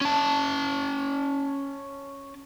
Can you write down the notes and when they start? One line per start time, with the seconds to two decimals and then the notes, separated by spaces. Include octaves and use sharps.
0.01 C#4 A5